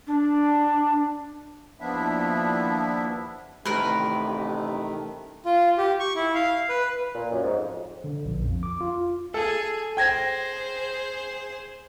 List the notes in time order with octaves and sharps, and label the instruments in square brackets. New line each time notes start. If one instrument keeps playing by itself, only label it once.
[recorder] D4
[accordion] D#2 F3 B3 D4 E4 E5
[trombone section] A1 C3 [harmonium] D#3 A3 [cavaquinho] A#4 B4
[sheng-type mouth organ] F4
G4
C#6
E4
F5
B4
[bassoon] A#2
F#2
G#2
F2
[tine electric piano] D3
A#1
F2
D6
F4
[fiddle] G#4 [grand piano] A4
[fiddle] G#4 C5 [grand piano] G5 G#6 A#6